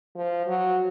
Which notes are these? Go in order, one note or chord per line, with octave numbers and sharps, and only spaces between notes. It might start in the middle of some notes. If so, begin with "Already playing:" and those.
F3
F#3